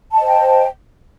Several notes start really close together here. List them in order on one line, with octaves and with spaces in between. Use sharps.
A5 D#5 C5 G5